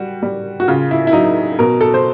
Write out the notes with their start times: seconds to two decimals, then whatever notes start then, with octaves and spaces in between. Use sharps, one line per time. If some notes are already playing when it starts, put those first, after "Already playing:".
Already playing: G3 F#4
0.22 G3
0.60 F#4
0.68 C#3 F4
0.91 E4
1.07 E4
1.12 F#3 D#4
1.59 B2 A#4
1.81 A4
1.94 C5